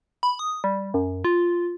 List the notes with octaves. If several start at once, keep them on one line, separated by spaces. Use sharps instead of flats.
B5
D#6
G3
F#2
F4